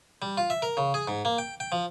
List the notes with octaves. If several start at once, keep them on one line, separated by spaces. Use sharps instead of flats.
G3
F4
E5
A#4
C#3
G#4
G#2
A#3
G5
G5
F3